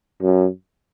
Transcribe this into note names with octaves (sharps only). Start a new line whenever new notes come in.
F#2